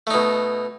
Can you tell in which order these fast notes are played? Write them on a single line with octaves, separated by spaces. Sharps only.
A3 D#4 B2